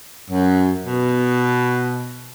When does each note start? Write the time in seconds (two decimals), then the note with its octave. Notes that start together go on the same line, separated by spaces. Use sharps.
0.30 F#2
0.86 B2